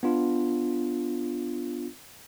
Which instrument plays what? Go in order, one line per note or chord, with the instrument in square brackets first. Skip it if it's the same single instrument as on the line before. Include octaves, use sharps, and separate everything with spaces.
[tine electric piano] B3 D4 F4